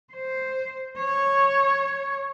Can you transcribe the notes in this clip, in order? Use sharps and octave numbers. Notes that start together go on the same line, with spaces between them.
C5
C#5